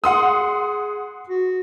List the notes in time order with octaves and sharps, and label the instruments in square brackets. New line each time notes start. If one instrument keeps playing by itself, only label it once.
[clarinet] G#4 [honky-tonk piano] F#5 C6 D#6
[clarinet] F#4